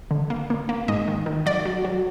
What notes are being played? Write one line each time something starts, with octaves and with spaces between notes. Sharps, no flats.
D3
A#3
A#3
A#3
G#2 D#5
D#3
D#3
F#3 D5
F#3
F#3